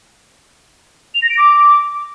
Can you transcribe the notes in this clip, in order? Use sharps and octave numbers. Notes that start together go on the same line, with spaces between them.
F7
A#6
D7
D6